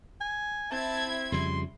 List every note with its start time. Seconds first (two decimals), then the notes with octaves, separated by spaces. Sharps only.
0.21 G#5
0.72 C4 E4 A5 G#6
1.32 F2 C#3 G3 C6